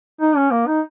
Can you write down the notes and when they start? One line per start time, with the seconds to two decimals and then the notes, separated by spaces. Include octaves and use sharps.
0.21 D#4
0.36 C#4
0.51 A#3
0.67 D#4